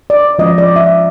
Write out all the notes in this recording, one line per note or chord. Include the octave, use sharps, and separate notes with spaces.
D5
F3 G#3 C#4 F4 D#5
D5
E5